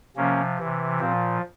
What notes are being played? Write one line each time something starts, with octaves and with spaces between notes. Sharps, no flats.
C3 F3 A#3 C#4
C3 E3
A#2 F3 C4